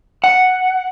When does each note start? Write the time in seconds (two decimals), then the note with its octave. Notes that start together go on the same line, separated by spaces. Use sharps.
0.24 F#5